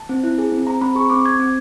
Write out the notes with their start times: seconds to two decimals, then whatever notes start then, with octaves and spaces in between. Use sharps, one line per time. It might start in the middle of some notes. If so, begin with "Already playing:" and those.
Already playing: A5
0.09 C4
0.24 E4
0.38 G#4
0.52 C4
0.67 C4 A#5
0.81 C4 B5
0.95 G#4 C#6
1.10 C4 D6
1.25 C4 G#6
1.39 C4